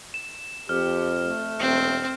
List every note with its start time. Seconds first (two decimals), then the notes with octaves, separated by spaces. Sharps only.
0.14 E7
0.69 F2 G4 F6
1.21 A3
1.59 E1 C4